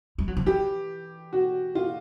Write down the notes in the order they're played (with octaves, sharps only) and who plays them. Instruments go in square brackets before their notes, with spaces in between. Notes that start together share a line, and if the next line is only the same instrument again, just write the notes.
[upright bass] G3
F#3
F3
[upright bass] E3 [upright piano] G4
[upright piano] F#4
F4